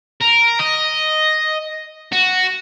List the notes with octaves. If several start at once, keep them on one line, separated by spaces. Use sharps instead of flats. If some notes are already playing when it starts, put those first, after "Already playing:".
A#4
D#5
F#4